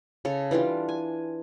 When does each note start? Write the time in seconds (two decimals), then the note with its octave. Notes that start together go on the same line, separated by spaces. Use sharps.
0.25 C#3 A4 C#5
0.51 E3 G3 D4 F4
0.89 G#5